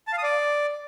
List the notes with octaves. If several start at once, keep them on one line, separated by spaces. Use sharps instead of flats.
A5
F5
D#6
D5